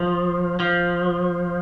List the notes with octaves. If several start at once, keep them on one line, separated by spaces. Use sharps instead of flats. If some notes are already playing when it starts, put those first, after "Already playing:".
Already playing: F3
F3